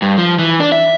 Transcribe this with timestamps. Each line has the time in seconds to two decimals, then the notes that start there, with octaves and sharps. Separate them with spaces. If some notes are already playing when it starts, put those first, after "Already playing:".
0.02 G2
0.18 F3
0.39 E3
0.60 D4
0.72 E5